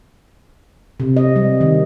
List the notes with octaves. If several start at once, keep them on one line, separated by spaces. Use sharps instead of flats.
C3
D#5
G3
D#3